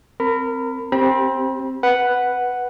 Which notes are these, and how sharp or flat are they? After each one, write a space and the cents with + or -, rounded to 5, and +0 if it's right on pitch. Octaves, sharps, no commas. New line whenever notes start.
C4 +0 A#4 -20 B5 +15
C4 +10 G4 +0 B5 -35
B4 +0 F#5 +0